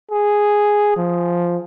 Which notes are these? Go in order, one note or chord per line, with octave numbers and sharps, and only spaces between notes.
G#4
F3